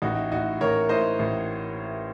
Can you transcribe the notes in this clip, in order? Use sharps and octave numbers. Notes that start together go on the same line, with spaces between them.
A1 D#4 F#4
A2 D#4 F#4
A1 A#4 C#5
A2 C5 D#5
A1